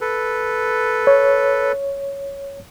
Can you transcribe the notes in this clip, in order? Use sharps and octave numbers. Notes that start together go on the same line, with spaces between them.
A4 B4
C#5